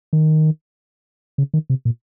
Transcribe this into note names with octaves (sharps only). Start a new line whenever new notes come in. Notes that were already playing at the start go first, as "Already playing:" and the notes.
D#3
C#3
D#3
C3
A#2